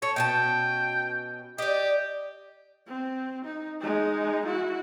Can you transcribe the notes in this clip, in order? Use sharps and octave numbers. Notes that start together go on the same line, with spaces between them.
A4 C#5
B2 C#4 G5 A5
G4 D5 D#5
C4
D#4
G#3 D#4
E4 F#4